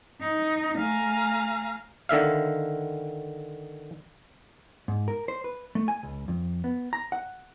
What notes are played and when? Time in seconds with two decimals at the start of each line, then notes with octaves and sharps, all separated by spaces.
0.19 D#4
0.76 A3 F5 G#5 A#5
2.09 D3 D#3 E5 F5
4.88 G#2
5.08 A#4
5.28 C5
5.44 B4
5.75 A3
5.88 G#5
6.03 C#2
6.28 F2
6.64 B3
6.93 A#5
7.12 F#5